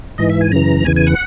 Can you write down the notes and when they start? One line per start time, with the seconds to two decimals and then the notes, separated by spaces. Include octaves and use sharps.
0.18 G#2 E3 D#5
0.30 E5
0.41 G#5
0.52 F#2 C#3 E3 A#5
0.84 E2 C#3 E3 G#5
0.96 G#5
1.07 F#5